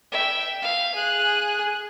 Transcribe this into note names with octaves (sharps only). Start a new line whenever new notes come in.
E5 G5
F5
G#4 F#6